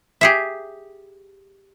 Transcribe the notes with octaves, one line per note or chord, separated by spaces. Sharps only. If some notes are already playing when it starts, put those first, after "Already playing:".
G4 G#4 E5